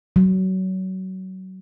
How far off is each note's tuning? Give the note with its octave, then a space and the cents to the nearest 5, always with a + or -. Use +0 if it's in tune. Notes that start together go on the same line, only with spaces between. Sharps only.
F#3 +25